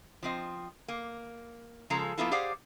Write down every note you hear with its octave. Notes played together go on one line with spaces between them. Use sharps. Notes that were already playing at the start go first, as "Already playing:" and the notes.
F3 C4 D#5
A#3
C#3 F3 G#3 G#4 A4 A#5
F3 A#3 B3 E4 F4 A4
G4 G#4 C5 D5 F5 F#5